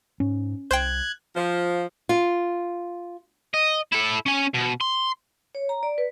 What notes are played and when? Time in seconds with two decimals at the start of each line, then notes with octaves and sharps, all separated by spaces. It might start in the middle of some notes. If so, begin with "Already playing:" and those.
0.20 G#2 C#4
0.71 C2 C5 G5 F#6 G#6
1.36 F3
2.09 F4
3.54 D#5
3.93 E4 A4
4.26 C#4 G#5
4.54 B2
4.81 C6
5.55 C#5
5.69 A#5
5.83 D5
5.98 B4